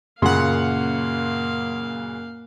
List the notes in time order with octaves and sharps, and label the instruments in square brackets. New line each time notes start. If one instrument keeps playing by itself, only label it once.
[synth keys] F#2 F#5 [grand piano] A#2 C#3 C6 [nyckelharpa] A#3 F5